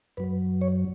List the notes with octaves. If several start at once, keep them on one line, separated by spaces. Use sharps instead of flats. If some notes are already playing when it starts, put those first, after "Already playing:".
F#2 F#3 B4
C#5